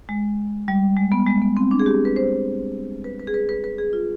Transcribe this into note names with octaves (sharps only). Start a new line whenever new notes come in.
G#3
G3
G#3
B3
G#3
B3
C4
D4
G#4
G4
B4
C5
B4
B4
G#4
B4
B4
B4
G#4
F4